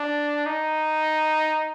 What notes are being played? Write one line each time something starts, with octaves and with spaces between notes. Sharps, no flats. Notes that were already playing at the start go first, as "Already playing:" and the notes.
Already playing: D4
D#4